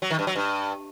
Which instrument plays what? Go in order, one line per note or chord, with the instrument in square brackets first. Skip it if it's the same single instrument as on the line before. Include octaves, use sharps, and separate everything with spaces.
[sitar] F#3
D#3
G2
F#3
G2